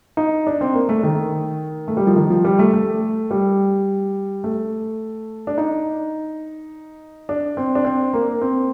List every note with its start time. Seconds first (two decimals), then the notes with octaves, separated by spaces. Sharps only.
0.17 D#4
0.47 D4
0.61 C4
0.74 A#3
0.89 A3
1.03 D#3
1.88 A3
1.97 G3
2.07 F3
2.16 D#3
2.30 F3
2.44 G3
2.59 A3
2.73 A3
3.31 G3
4.44 A3
5.47 D4
5.58 D#4
7.29 D4
7.57 C4
7.75 D4
7.85 C4
8.14 A#3
8.42 C4